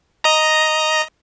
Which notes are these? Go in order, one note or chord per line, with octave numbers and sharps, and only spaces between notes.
D#5 A#5